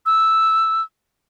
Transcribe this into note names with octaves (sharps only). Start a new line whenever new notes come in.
E6